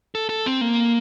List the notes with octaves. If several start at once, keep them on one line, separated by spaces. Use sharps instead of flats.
A4
A4
C4
A#3